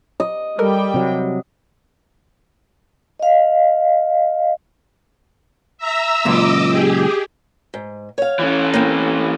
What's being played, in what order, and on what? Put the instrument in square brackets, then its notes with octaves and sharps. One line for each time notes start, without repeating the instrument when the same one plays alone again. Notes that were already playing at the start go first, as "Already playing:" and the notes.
[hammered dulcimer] D#5
[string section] G3 G5 [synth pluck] A4 A#4
[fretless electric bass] C3 F#3
[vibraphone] D#5 F5
[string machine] E5 A#5 E6
[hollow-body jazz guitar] C#2 F#2 A#2 [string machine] D#5 D6 E6
[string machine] G4 G#4
[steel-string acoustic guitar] G#2
C#5 F5
[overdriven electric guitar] E3 C#4
[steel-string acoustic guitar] A#3 C4